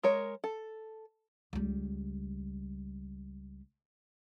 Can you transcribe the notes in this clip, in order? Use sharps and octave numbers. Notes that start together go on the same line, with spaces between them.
G#3 A#4 C#5
A4
C#2 G3